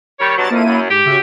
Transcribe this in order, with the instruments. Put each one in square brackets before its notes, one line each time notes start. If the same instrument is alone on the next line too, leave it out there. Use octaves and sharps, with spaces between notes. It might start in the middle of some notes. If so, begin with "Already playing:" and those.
[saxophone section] D#3 G3 C#5
[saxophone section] G2 B2 F#3 [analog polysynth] A5 A#5 A6
[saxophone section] F2 [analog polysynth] A#3 E4 D#7
[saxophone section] F#2
[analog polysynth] G#2 [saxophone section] G4
[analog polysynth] C#3 F#4 E5